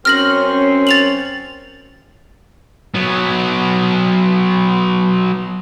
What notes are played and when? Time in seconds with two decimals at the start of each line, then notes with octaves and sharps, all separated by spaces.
0.05 F#2 C4 C#4 F6 A#6 F#7
0.87 A6 F7 F#7
2.95 F#3 B3